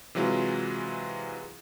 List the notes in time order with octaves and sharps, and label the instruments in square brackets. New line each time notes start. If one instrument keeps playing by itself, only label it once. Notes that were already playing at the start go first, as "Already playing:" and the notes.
[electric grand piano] C3 E3 F#3 G#3 F4